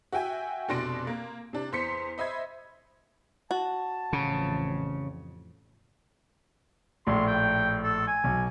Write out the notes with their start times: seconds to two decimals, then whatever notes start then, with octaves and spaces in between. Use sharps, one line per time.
0.12 F#4 E5 G5 G#5
0.69 F1 B2 D4 C6 A#6 D7
1.07 A#3
1.53 C3 D4
1.72 E2 C5 C6 B6 C#7
2.18 C5 D#5 E5 B5 G#6
3.51 F#4 A5
4.13 A1 F2 C#3
7.07 A#1 A2 C6
7.27 G5
7.84 A4
8.08 G#5
8.24 B1